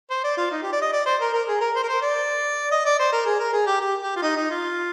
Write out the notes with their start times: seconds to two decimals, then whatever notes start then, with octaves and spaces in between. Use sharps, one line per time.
0.10 C5
0.24 D5
0.37 F4
0.51 D#4
0.62 G4
0.73 D5
0.82 D#5
0.93 D5
1.06 C5
1.21 A#4
1.33 A#4
1.48 G#4
1.61 A#4
1.76 C5
1.83 A#4
1.88 C5
2.02 D5
2.71 D#5
2.85 D5
2.99 C5
3.12 A#4
3.26 G#4
3.39 A#4
3.53 G#4
3.67 G4
3.80 G4
4.01 G4
4.16 F4
4.22 D#4
4.36 D#4
4.50 F4